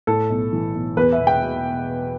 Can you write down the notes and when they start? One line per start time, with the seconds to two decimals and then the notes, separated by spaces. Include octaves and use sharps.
0.07 A2 A4
0.30 B1
0.53 E3
0.75 B1
0.97 E2 B4
1.13 E5
1.20 E1
1.27 G5
1.42 B2